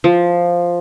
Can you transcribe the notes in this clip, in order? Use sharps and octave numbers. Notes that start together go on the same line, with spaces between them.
F3